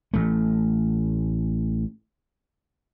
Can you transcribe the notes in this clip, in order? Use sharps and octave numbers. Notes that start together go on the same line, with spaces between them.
A1 A3